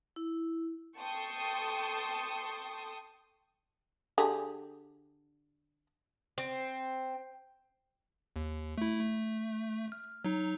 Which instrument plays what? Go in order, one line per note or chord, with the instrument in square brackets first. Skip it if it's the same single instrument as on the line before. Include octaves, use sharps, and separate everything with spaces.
[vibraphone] E4
[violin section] A4 G5 A5 C6 C#6 D#6
[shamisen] D3 G4 G#4
[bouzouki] C4
[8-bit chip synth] D#2
A3 E4
A3
F6
F#3 D#4